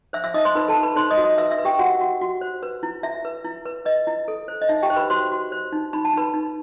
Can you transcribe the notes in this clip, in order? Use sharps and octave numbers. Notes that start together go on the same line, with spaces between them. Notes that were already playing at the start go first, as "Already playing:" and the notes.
C5 E5 E6
E5 E6
D#4 D#5 D#6
C5 C6
D#4 B4 B5
A4 A5
D#4
B4 B5
D#4 C5 C6
D#5 D#6
F#4
D#5 D#6
B4 E5 E6
E5 E6
B4
G4 G5
F#4 F#5
F#4
F#4
C5
B4
E4
E4 E5
B4
E4
B4
B4 D#5
E4
A4
C5
D#5
D#4 E5
G4 G5
C5
B4 B5
F#4 C5 C6
F#4
C5
D#4
D#4 B5
A5
D#4 B4 B5
D#4